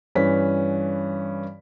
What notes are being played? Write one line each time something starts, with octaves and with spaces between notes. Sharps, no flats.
G2 E3 C#4 B4 B6